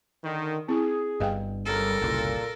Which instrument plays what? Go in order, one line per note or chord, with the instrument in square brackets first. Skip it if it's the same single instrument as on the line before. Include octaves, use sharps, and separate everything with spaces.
[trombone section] D3 D#3
[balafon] C4 E4 [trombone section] G#4
[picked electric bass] G1 G2 [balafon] D#5 F5 G5
[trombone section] C#2 G3 [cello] A4 A#4
[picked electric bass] F#1 C2 [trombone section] A#2